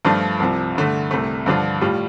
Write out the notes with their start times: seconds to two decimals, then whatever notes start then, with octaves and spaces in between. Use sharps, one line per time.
0.05 G2 F3 A3 D4 F4
0.40 C2 C3 F3
0.75 G2 D3 A3
1.11 C2 C3 A3
1.46 G2 D3 F3 D4 F4
1.81 A2 G3 F4